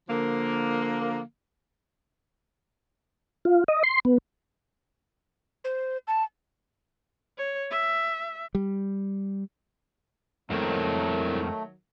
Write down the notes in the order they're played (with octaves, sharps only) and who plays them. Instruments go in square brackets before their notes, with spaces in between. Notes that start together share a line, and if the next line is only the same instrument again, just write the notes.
[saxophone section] D3 F3 A#3
[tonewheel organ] F4
D#5
C6
B3
[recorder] C5
A5
[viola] C#5
E5
[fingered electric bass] G3
[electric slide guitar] F2 G#3 C4 [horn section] D#3 F#3 [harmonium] A3 [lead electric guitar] E4 A#4